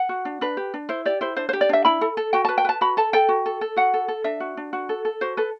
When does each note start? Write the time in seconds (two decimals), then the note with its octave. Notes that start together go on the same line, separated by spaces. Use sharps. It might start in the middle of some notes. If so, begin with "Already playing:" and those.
Already playing: F#5
0.09 F#4
0.25 D4
0.41 D4 B4
0.57 G4
0.74 D4
0.89 E4 C5
1.05 G4 D5
1.21 E4 C5
1.37 D4 C5
1.49 C5
1.53 G4
1.61 D5
1.69 D4 E5
1.85 E4 B5
2.01 A4
2.17 A4
2.33 F#4 G5
2.45 A5
2.49 B4
2.58 G5
2.65 B4 A5
2.81 F#4 B5
2.97 A4 A5
3.13 A4 G5
3.29 F#4
3.46 A4
3.61 A4
3.76 F#4 F#5
3.94 A4
4.08 A4
4.24 D4 E5
4.40 F#4
4.57 D4
4.73 F#4
4.89 A4
5.05 A4
5.21 F#4 C5
5.37 A4 B4